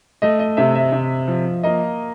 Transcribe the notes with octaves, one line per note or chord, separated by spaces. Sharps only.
A3 D#5
D#5
C3 E5
E5
C3
F3
A#3 D#5